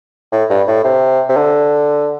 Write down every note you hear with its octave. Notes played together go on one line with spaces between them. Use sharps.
A2
G2
A2
C3
C3
D3